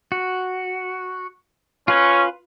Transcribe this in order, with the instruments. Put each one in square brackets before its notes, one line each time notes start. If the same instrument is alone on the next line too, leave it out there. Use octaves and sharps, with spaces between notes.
[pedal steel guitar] F#4
[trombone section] C#4 [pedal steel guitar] F4 B4